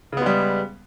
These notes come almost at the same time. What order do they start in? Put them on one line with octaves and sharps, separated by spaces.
C#3 B3 G#3 G3